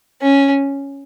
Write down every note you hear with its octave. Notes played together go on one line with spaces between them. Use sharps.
C#4